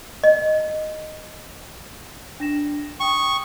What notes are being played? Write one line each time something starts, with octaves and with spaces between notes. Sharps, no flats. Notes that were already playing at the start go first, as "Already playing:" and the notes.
D#5
D4 A#6 E7
G5 C#6 D#6